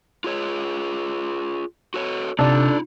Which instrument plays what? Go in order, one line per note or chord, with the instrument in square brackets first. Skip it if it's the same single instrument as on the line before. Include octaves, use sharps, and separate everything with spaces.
[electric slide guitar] F4 G#4 C#5
F#4 A4 C#5
[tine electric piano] G1 C3 D5 [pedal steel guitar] D4 A4 [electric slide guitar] D#4 F4